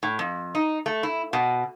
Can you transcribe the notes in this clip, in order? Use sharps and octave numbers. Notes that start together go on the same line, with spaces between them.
A2
F2
D#4
A3
E4
B2